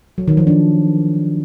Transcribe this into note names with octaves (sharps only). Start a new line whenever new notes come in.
F#3
D#3
F3
D4